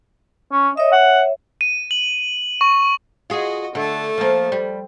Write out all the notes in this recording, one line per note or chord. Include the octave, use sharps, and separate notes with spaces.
C#4
C#5 D#5 E5
F#5
D#7
F#7
C#6
F4 F#4 G#4 D#5
D3 A3 A5
F3 A#3
G3